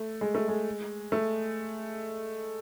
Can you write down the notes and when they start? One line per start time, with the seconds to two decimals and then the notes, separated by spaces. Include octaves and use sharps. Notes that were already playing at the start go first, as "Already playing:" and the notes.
Already playing: A3
0.21 G#3
0.35 A3
0.48 G#3
1.12 A3